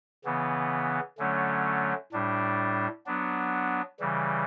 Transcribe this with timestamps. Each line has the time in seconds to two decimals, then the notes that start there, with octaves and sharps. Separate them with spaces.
0.25 C#3 E3 B3
1.18 D3 F#3 A3 C#4
2.12 A2 G3 D4
3.06 F#3 B3 D4
4.00 C#3 E3 G3